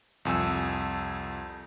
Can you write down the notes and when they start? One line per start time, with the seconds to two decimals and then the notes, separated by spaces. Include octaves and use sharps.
0.25 C2 F2 G#5 E6